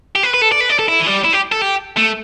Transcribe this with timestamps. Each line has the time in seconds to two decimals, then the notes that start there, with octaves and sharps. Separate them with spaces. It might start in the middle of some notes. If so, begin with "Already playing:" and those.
0.15 G4
0.23 B4
0.34 B4
0.42 A4
0.52 D5
0.60 B4
0.69 D5
0.79 A4
0.88 E4
1.00 E3
1.07 G3
1.25 E4
1.33 G4
1.52 A4
1.61 G4
1.97 A3